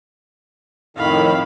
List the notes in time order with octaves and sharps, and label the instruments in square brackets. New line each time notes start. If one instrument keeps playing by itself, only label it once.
[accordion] F2 A2 D#3 [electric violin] F5 B5